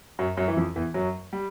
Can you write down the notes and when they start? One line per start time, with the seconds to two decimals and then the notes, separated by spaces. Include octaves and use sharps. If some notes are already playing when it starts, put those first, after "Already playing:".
0.19 F#2 F#3
0.37 F#2 F#3
0.48 E3
0.57 F2 F3
0.76 E2 E3
0.94 F#2 F#3
1.33 G3